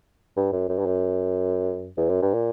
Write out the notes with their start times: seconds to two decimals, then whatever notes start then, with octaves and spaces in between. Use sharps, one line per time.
0.37 G2
0.53 F#2
0.69 F#2
0.78 G2
0.86 F#2
1.97 E2
2.10 F#2
2.22 G2
2.34 A#2